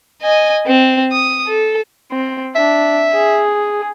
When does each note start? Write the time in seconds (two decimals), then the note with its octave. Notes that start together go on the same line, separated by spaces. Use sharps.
0.22 D#5 G#5
0.67 C4
1.12 D#6
1.47 A4
2.12 C4
2.56 D4 E5
3.14 G#4